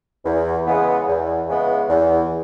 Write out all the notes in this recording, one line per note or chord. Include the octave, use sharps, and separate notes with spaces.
E2
C#3 E3 G#3 B3
E2
C#3 E3 G#3 B3
E2